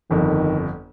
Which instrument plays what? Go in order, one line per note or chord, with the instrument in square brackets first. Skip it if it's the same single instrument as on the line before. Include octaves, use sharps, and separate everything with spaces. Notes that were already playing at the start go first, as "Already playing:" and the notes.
[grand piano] G1 F2 [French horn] D#3